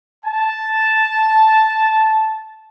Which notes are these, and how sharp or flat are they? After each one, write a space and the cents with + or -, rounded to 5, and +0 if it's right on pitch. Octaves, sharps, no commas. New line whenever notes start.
A5 -5